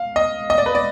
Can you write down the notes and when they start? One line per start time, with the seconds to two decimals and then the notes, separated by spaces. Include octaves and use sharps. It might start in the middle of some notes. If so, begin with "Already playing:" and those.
Already playing: F5
0.16 D#5
0.50 D#5
0.58 D5
0.66 B4
0.75 D5